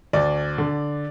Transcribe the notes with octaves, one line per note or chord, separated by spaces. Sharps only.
D2 D5
D3